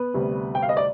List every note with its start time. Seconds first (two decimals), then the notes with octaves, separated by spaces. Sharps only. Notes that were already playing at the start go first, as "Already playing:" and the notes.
Already playing: B3 B4
0.14 D2 C3 G3
0.55 G5
0.62 F5
0.69 D#5
0.77 D5